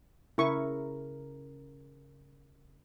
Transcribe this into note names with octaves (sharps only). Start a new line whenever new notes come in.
C#3 E4 A#4 C#6